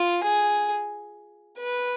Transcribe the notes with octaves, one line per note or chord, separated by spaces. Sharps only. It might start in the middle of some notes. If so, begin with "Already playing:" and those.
Already playing: F4
G#4
B4